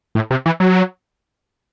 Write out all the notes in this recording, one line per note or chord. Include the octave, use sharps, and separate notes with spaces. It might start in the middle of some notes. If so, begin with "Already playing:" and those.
A2
C3
E3
F#3